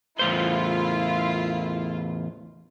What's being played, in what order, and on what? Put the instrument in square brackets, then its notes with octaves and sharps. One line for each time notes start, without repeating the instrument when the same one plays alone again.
[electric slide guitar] E2 A2 C5 [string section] E4 F4